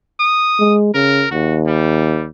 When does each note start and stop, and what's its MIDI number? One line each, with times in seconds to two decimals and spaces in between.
0.20 0.75 87
0.60 0.90 56
0.94 1.26 49
0.94 1.30 70
1.31 2.29 39
1.31 1.59 66
1.67 2.26 55